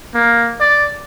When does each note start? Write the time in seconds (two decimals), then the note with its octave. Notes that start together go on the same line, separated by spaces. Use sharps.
0.14 A#3
0.60 D5